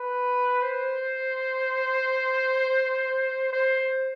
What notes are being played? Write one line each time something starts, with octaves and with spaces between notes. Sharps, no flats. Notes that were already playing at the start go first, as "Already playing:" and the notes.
Already playing: B4
C5
C5